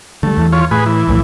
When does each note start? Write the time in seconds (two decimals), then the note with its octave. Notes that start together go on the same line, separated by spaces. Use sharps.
0.23 D3 G3 A3
0.37 E2 E3
0.52 F4 C#5
0.71 A2 G#4 B4
0.86 E3
1.08 B1 F2 A2